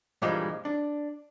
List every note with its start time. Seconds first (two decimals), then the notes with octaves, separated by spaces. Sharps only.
0.22 G2 A#2 E3 F3 G3 G#3
0.65 D4